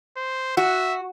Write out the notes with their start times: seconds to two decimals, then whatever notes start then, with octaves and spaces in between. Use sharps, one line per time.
0.17 C5
0.57 F#4 E5